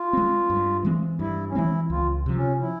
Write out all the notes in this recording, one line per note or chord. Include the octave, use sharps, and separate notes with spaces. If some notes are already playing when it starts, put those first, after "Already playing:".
Already playing: F4
G#3 C4
G2
E3 G#3 C4
G2 E4
C#4
E3 G#3 C4 E4
C#2 F4
C3 F3
C#4
E4